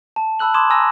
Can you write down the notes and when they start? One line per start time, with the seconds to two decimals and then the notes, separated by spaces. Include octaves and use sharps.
0.16 A5
0.39 A5 B5 E6 F#6 F#7
0.54 B5 C6 D6 D#6 G#6 E7
0.70 G#5 A#5 C6 D#6 E6 A#6